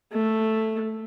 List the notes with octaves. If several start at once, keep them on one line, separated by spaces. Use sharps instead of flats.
A3